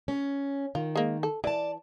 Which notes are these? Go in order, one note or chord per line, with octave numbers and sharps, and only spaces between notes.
C#4
D#3 F4
G#3 A#3
A4
E3 D5 A5